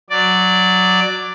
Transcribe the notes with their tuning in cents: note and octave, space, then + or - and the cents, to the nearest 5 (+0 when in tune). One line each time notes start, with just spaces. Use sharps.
F#3 -5 D5 +0